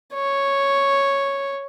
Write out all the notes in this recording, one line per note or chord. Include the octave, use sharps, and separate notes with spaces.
C#5